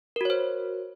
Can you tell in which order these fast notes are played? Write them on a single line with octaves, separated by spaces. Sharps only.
A#4 F#4 C#5 C5